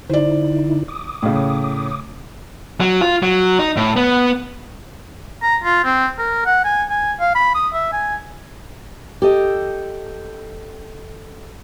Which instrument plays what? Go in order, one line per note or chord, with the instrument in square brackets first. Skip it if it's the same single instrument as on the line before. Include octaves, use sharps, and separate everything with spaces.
[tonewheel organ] D3 D#4 E4 [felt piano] C5 D5
[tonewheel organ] D6 D#6
[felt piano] A2 C#3
[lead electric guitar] F#3
F4
F#3
D#4
A2
B3
[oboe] A#5
F4
C4
A#4
F#5
G#5
G#5
F5
B5
D#6
E5
G#5
[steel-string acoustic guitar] G4 A4 D#5